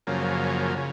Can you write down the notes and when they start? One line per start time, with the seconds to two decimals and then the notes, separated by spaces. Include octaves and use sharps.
0.07 F#2 C#3 F3 A#3
0.76 C#3